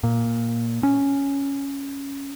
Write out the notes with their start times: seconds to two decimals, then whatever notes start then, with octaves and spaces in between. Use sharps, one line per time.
0.04 A#2
0.83 C#4